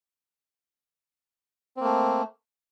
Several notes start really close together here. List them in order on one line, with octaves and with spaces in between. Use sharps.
C4 A#3 A3